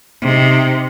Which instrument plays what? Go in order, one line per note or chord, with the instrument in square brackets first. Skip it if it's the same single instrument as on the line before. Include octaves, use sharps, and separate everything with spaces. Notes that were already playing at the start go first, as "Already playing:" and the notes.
[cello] C3 D#4